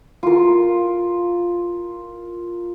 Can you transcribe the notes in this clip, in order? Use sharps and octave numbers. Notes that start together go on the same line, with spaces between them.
F4 A#4